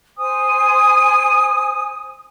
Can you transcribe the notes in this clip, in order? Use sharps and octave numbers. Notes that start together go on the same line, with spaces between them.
C5 G#5 D#6